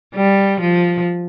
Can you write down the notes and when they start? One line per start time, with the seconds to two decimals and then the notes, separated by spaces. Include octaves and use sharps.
0.15 G3
0.60 F3